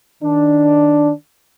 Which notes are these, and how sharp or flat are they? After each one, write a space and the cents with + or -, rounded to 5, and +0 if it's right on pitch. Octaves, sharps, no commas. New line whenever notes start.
D#3 +0 D4 +0